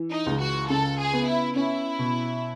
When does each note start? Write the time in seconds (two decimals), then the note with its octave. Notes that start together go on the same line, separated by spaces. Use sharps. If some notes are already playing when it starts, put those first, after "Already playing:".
Already playing: E3
0.12 D#4
0.26 C#2
0.40 F#4
0.70 C#3 A4
0.99 G#4
1.13 B3
1.26 E4
1.56 C#4 E4
1.99 B2